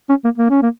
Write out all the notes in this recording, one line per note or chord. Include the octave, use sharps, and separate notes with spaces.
C#4
A#3
A#3
C#4
A#3